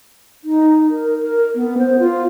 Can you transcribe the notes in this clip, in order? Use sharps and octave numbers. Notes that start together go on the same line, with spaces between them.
D#4
A#4
A#4
B3
C5
F4